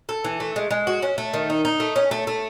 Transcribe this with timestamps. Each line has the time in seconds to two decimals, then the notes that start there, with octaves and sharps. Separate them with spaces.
0.09 A4
0.24 E3
0.40 A3
0.56 G#3
0.71 G#3
0.87 F#4
1.02 C#4
1.18 A3
1.33 D#3
1.50 D#4
1.65 D#4
1.80 A3
1.96 C#4
2.11 A3
2.27 A3